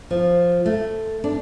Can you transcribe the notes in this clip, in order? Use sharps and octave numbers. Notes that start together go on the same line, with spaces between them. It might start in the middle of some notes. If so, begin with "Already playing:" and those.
F3
A3
D4